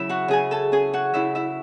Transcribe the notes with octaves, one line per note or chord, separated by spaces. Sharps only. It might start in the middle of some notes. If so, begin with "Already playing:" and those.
Already playing: C#3 F#3 E4 E5
F#4 F#5
C#3 G#4 G#5
A4 A5
C#4 G#4 G#5
F#4 F#5
C#3 E4 E5
E4 E5